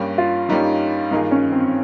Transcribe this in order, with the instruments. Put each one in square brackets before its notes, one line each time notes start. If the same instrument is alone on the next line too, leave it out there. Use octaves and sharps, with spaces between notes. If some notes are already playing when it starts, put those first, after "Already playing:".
Already playing: [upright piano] G2 G3 A#3 C#4 G4
[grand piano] F4
[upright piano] G2 G3 A#3 C#4 G4 [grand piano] D#4
[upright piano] G2 D#3 A#3 F4 G#4 [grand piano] D#4
[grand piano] C#4
C4